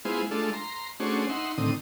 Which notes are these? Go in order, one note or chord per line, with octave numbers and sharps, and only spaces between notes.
G#3 B3 E4 F4 G#4 C5
G#3 A3 D4 F4 A4
A#5 C6
A3 C#4 D4 F#4 G#4 C5
D#4 E5 F#5 C6
A2 D3 D#3 C4 D#6